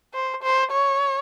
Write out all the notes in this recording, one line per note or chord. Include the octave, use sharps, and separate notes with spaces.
C5
C5
C#5